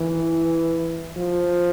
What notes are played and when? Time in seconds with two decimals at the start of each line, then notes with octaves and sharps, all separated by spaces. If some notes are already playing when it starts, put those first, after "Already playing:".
Already playing: E3
1.17 F3